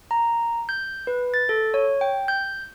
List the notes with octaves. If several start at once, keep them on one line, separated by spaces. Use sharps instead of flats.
A#5
G6
B4
A6
A4
C#5
G5
G6